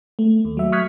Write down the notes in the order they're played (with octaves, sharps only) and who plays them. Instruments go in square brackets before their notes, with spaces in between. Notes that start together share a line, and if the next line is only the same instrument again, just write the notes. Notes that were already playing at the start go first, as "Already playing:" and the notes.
[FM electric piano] A3
D#2
F#3 E5
C#6 D#6 F6 F#6 G#6 B6